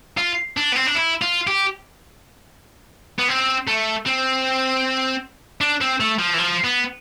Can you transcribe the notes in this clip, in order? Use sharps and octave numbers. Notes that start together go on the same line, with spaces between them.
F4
D4
B3
C4
D4
E4
F4
G4
B3
C4
A3
C4
D4
C4
A3
F3
E3
F3
B3